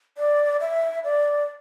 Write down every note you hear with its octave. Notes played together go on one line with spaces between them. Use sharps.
D5
E5
D5